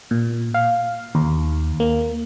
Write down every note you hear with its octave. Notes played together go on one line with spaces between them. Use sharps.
A#2
F5
D#2
A#3